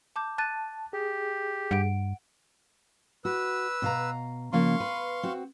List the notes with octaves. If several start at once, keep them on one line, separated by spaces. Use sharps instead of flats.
A5 D6 G6
A5 F#6 A6 D#7
G4 G#4
G2 F#5 D7
F#4 B4 E6
B2 F5 A#5
C#3 F3 A#3 F5 C6 C#6
B4
C4 F#4